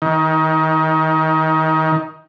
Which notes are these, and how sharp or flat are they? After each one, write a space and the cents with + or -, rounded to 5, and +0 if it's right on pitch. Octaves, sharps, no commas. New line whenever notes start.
D#3 +25